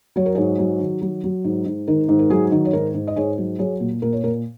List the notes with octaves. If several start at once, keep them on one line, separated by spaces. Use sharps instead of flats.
F#3 C#5
A#4
G#2 G#4 C#5
F#3
D#3
F#3
F#3
G#2
G#2
D#3 A#4
G#2
A#4
F#3 G#4
D#3
C#5
G#2 A#4
G#2
D#5
G#2 G#4 C#5
F#3
F#3 G#4 C#5
A#2
A#2 A#4
C#5
A#2 A#4